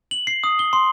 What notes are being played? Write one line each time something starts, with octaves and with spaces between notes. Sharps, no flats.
F#7
C7
D#6
G7
C6